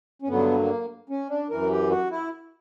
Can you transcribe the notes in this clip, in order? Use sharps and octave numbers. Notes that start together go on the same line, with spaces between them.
C#4
G2 D3 F#3 B3
A#3
C#4
D4
F#2 E3 A#4
G4
F#4
E4